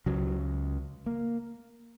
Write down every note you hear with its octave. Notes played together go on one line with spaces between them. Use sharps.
C#2 C#3 F#3
A#3